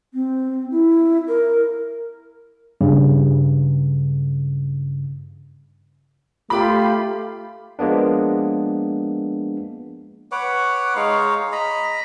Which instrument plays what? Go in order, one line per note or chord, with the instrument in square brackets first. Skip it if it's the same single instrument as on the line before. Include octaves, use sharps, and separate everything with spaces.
[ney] C4
E4
A#4
[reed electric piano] G2 C#3
[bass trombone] A3 [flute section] F4 G4 [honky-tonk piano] B5 D6
[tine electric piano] F3 G#3 A#3 B3 D4
[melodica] B4 C#5 F#5 D6
G#3 D#4 C#5 F5
D#5 A#5 B5